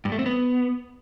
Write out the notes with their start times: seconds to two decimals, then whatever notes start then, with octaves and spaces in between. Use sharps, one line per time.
0.05 G2
0.12 A3
0.19 C4
0.26 B3